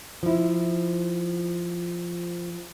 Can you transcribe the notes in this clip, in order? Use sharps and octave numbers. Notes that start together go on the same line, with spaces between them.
F3 E4